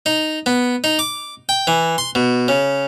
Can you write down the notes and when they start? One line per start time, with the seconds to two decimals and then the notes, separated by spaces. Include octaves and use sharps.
0.06 D#4
0.46 B3
0.84 D#4
0.99 D6
1.49 G5
1.67 E3
1.98 C6
2.15 B2
2.48 C#3